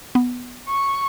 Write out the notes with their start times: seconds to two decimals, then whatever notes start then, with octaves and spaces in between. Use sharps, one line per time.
0.15 B3
0.68 C#6